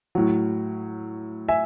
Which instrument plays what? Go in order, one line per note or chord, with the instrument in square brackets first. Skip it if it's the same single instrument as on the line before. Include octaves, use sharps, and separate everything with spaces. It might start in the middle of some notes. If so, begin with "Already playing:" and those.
[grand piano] A2 F#3
E5 G#5